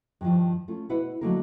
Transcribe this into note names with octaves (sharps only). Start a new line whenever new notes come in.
G2 D#3 F3
A3 C#4 F4
B2 E4 B4 F#5
D3 F#3 A3 A#3 D#4 A#4